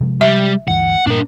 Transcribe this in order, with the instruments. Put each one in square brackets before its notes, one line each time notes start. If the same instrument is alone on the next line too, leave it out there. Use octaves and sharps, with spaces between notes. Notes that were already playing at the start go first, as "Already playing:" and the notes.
[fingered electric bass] C3 F3 G#3
[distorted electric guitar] G3 [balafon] E5
[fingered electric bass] D2 G2 E3 [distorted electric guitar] F#5
[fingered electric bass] G2 A#2 [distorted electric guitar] D4 A#4